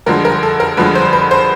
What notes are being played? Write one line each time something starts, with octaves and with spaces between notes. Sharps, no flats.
G2 D3 F3 G#3 A#4
A#4
A4
A#4
G2 D3 F3 G#3 B4
C5
B4
C5